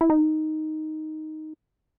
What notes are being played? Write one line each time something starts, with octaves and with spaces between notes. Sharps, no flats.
E4
D#4